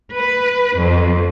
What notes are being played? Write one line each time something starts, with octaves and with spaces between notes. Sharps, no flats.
B4
F2